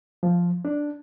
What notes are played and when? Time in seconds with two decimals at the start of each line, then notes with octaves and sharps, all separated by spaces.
0.23 F3
0.65 D4